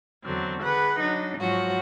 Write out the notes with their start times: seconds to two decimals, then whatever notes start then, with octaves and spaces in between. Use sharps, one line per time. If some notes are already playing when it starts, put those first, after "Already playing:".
0.24 E2 D3 F#3 C4
0.62 D3 G#4 B4 F#5
1.00 F#3 D4 D#4
1.38 G#2 F3 F#3 F#4